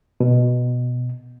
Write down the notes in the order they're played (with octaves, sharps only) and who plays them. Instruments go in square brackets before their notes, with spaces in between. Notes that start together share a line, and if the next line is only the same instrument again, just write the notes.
[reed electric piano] B2